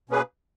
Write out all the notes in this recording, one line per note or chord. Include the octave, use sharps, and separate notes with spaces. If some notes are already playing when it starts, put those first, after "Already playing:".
B2 A#3 C#4 G#4 B4